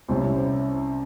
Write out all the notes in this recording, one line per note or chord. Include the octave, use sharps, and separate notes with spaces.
C2 C3 G3 C#4 E4 C5
C5